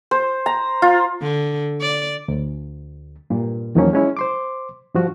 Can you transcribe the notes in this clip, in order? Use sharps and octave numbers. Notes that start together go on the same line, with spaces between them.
C5
A#5
F4
D3
D5
D2
G2 A#2
E2 D#3 F3 F#3 A#3 C#4
G#3 C#4 E4
C5 C6 D6
G2 F3 F#4